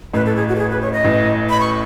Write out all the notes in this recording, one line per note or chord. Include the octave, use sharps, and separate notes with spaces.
A1 A2 B4
A4
G#4
F#4
A4
G#4
B4
C#5
D#5
A1 A2
B5
C#6